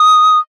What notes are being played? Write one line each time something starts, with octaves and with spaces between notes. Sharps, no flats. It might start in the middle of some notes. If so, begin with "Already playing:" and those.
Already playing: D#6